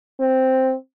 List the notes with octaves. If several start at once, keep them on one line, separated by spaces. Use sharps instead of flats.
C4